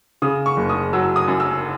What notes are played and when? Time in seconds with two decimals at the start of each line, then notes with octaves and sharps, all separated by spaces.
0.22 C#3 D#6
0.46 C#6
0.57 F#1
0.70 D#6
0.93 F#3 E6
1.16 D#6
1.28 F#2
1.40 E6